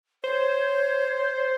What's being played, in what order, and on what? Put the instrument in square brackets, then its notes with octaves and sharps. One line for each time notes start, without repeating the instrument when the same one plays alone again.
[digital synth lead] C5 [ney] C#5